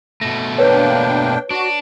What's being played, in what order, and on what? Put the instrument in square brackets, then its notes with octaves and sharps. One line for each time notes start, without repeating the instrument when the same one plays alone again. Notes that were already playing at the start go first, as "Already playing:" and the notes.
[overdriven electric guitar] B2 A3 [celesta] A#6
[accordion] A#3 D4 G5 [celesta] B4 C#5
[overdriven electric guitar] D4 [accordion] F#4